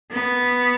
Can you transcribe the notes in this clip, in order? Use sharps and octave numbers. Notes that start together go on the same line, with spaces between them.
B3